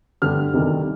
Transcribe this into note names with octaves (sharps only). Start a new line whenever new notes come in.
G2 D3 G3 F6
D2 C3 D#3 G3